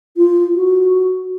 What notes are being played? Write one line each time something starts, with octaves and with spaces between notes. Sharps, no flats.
F4
F#4